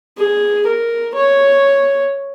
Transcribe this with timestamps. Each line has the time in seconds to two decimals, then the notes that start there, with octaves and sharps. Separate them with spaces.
0.17 G#4
0.66 A#4
1.14 C#5